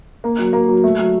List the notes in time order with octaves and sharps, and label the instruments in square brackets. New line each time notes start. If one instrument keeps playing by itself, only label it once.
[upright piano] A#3
F#3
A#3
F#3
A3
F#3